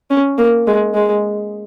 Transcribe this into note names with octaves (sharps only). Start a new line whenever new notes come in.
C#4
A#3
G#3
G#3